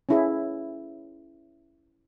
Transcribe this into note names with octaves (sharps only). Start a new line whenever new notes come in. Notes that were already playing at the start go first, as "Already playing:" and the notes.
C#4 E4 G#4